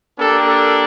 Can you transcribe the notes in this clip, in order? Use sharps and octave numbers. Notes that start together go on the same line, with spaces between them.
A#3 D4 G4 A4
A4